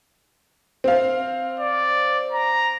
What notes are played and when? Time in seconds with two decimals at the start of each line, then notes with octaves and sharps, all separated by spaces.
0.84 C4 F5
1.60 D5
2.32 A#5